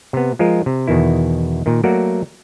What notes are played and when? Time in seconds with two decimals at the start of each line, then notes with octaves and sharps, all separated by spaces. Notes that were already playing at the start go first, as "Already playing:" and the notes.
0.13 C3 B3
0.39 F3 G#3 F4 A#4
0.66 C3
0.88 E2 B2 D#3 E4
1.66 A#2 D#3
1.84 F#3 A3 A#3 F#4 A#4 D5